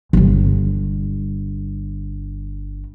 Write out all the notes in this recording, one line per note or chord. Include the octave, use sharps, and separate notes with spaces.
D1 G1